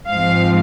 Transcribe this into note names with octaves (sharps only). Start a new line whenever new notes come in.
G#2 F3 C4 F5